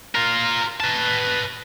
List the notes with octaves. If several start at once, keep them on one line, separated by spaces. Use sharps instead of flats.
F4 A#4
B4 A5